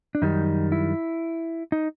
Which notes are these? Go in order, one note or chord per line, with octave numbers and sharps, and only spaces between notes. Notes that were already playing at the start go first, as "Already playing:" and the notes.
D4
F#2 D#3 G3 D#4
E4
D#4